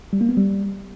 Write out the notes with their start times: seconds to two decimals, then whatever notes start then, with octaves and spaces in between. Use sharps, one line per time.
0.13 G3
0.21 A#3
0.29 B3
0.37 G3